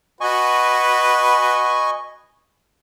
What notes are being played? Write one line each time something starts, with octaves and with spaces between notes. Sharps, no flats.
F#4 B4 D#5 G#5 C#6